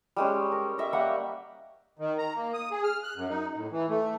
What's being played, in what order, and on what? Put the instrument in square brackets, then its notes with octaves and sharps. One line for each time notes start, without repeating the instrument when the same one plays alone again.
[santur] G3 G#3 C#4
A#4
D#5 E5 G5
G3 A#3 F#5
[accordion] D#3
A#5
A#3
D#6
G#4
F6
F#6
F#2
D#4
A2
E3
A3